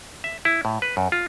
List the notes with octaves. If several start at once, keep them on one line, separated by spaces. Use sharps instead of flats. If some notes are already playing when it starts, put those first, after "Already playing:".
E5
E4
A2
B4
F#2
F4